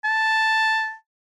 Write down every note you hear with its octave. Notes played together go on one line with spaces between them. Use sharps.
A5